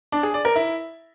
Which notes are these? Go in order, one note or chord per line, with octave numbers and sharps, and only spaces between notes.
D4
G#4
D5
A#4
E4